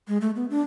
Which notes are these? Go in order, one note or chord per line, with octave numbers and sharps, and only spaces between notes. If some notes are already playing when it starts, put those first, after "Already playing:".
G#3
A3
B3
D4